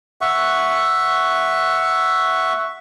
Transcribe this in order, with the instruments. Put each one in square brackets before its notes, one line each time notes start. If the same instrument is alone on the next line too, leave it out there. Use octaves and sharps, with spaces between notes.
[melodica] E5 F#5 C#6